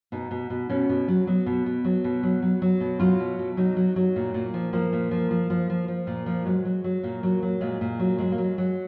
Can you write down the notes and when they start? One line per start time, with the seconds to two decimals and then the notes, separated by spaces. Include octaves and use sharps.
0.12 B2 D#4
0.31 B2
0.50 B2
0.69 B2 C#4
0.89 B2
1.08 F#3
1.27 F#3 B3
1.46 B2
1.66 B2
1.85 F#3
2.04 B2
2.23 F#3
2.42 F#3
2.62 F#3
2.80 B2
3.00 F#3 F4
3.20 B2
3.39 B2
3.57 F#3 D#4
3.77 F#3
3.96 F#3
4.16 A#2
4.34 A#2
4.54 F3
4.73 F3 A#3
4.93 A#2
5.11 F3
5.31 F3
5.50 F3
5.70 F3
5.88 F3
6.07 A#2
6.26 F3
6.45 F#3 G#3
6.65 F#3
6.84 F#3
7.03 A#2 A#3
7.23 F#3
7.43 F#3
7.61 A#2 G#3
7.81 A#2
7.99 F#3
8.18 F#3 G#3
8.32 A#3
8.38 F#3
8.44 G#3
8.58 F#3